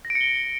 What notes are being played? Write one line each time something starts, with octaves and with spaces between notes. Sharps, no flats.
A#6
D7
C#7
G7